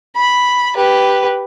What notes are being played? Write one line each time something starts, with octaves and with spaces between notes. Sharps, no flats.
B5
G4 B4